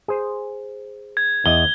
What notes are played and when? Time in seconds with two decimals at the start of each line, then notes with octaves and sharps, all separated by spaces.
0.08 G#4 C5
1.17 G#6
1.46 E2 D#5 G7